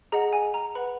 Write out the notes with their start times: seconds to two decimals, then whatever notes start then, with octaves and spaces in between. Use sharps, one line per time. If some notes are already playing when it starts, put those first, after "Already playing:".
0.12 G#4 D#5 F#5 A#5
0.33 G#5
0.54 A#5
0.75 B4 F#5 B5